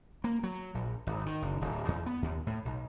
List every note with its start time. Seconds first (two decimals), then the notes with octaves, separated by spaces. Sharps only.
0.24 A#3
0.43 F#3
0.74 A#1
1.07 G#1
1.26 D#3
1.42 F#1
1.61 D1
1.88 E2
2.06 B3
2.22 D#2
2.47 A2
2.65 B1